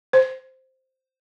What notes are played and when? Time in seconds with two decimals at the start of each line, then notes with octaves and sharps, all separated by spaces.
0.13 C5